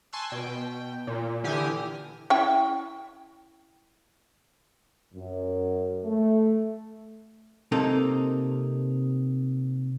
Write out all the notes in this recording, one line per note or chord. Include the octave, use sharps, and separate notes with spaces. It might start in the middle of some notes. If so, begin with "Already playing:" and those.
G#5 A5 C6 C#6 E6 F#6
B2 G5
A#2
D3 E3 G4 G#5 D#6 F6
C#4 E4 G5
F#2
A3
C3 A#3 D#4 A4